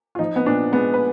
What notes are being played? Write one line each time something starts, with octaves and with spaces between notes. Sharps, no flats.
F4
F3 D#4
B3
A#2 D4
G#3 B3
B4